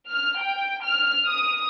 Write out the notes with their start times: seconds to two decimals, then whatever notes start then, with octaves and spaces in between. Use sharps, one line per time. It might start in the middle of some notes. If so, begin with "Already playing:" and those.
0.11 F6
0.42 G5
0.86 F6
1.28 D#6